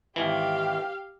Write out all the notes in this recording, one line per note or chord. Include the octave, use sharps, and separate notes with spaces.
G#1 E3 G4 F5